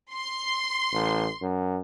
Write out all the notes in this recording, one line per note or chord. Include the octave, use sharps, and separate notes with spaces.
C6
A1
F#2